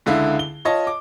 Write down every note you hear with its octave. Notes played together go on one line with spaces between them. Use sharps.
C#2 D3 E4 E5 F5
G7
F4 C#5 D#5 A5
D6